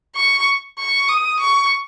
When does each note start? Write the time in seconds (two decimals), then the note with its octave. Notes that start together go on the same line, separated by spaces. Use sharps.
0.16 C#6
0.78 C#6
1.08 D#6
1.40 C#6